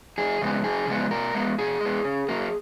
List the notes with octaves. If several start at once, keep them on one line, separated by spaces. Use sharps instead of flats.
F#2 G#4
C#3 G#3 B3
F#2 G#4
C#3 G#3 B3
B2 A#4
G#3 B3
B2 G#4
G#3 B3
C#3
F#3 A#3